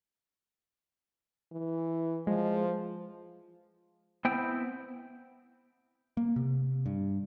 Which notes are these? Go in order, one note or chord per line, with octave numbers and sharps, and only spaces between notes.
E3
F3 G#3
B3 C4 E4 G5
A#3
C3
G2